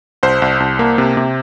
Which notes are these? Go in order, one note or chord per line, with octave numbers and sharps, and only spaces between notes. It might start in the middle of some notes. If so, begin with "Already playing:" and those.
C2 C5
C2
C2
A#3
C3
C3